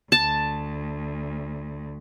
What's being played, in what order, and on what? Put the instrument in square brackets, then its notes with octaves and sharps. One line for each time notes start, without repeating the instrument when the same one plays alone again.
[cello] D2 [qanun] A5